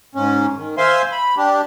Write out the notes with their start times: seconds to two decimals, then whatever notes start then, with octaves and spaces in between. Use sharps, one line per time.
0.15 G#2 C#4
0.57 D#3
0.78 C5 E5 F5 G#5 C6
1.12 B5
1.37 D4 G4